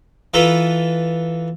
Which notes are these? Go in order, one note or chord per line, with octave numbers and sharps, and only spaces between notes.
E3 F4 A4 B4 A#5